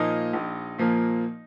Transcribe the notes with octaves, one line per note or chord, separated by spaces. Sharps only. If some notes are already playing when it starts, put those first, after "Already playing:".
Already playing: A#2 F3 A#3 D#4 D#5
A#1
A#2 F3 A#3